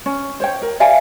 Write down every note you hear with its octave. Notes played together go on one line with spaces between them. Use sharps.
C#4
C5 C#5 G5
A#4
D5 E5 F5 G#5